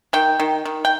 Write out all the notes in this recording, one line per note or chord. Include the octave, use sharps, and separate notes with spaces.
D#3 G5
D#3
D#3
G5